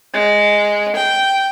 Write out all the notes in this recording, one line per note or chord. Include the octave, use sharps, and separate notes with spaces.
G#3
G5